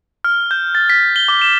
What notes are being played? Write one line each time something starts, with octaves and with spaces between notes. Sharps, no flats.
F6
G6
A6
B6
G7
D6
E7